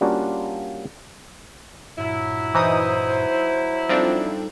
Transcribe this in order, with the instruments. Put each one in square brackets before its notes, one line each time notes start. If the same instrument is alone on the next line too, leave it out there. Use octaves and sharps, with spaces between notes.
[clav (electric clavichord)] G3 A#3 C#4 D4 F4 F#4
[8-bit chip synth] G2 A#2 [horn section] F#3 E4
[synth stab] E3 D#4 D#6 [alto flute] C5
[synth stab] F3 C4 D4 [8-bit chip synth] G3 D#4 A4